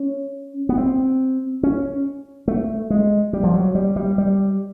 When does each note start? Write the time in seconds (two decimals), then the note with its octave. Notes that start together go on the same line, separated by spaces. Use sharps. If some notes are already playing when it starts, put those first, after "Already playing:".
Already playing: C#4
0.69 B3
0.78 C4
1.63 C#4
2.48 A3
2.90 G#3
3.33 G3
3.44 F3
3.54 F#3
3.75 G3
3.96 G3
4.18 G3